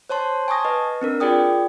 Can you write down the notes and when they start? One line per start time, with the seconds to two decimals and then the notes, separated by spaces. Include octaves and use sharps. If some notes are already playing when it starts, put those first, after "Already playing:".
0.09 C5 C#5 A5 C6
0.48 G#5 A5 C#6 D#6 A#6
0.65 B4 D#5
1.01 C4 D4 A#4
1.20 F4 G#4 D5 G5 D#6